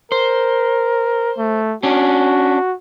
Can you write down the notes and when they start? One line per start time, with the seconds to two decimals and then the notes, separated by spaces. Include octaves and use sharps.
0.12 A#4 C5
1.38 A3
1.83 C#4 D4 F#4